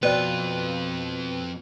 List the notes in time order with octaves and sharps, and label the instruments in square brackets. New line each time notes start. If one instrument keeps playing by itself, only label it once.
[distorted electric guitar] F2 F4 [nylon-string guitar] B2 [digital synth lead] B4 [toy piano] C5 D5 G5